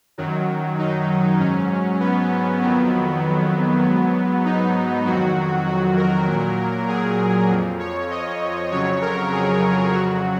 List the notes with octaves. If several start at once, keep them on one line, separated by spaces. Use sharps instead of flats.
F#2 D#3 F#3
D#4
G#2 F#3 C#4
B3
F2 D#3 F#3 B3
G#2 F#3
D#4
F2 D#3 F#3 F#4
F#4
A#4
A#2 F#3
G#4
F2 F3
C#5
D#5
F2 C#3 F#3 C#5
A#4
G#4
F2 C#3 F#3 F#4